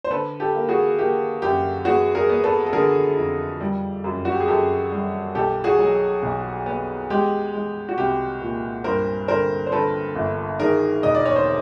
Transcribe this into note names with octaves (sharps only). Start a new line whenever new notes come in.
C5
D3 A4 B4
G4 A4
A#3
F#4 G#4
A#3 G4
F#2 G4
B3 F#4 G#4
G#4 A#4
B3
A4 B4
A4
D3 G#4 A#4
F2
G3
F#2
F#4
G4
G#4
F#2 G4 A4
G3
B1 G4 A4
F#4 G#4
F#3
B1
B3
G#3 G4
G#3
F#4
C2 G4
A#2
G2 A#4 C5
D3 A#4 C5
C5
D3 A4 B4
G1
D#3 G#4 A#4
E1 D#5
D5
C#5
C5